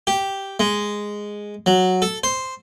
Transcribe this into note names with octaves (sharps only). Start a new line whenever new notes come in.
G4
G#3
F#3
A4
C5